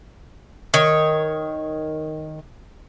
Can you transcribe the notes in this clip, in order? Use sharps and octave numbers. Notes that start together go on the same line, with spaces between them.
D#3 C#5